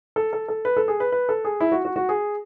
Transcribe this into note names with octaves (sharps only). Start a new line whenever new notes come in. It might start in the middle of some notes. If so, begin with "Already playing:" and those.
A4
A4
A4
B4
A4
G#4
B4
B4
A4
G#4
E4
F#4
F#4
F#4
G#4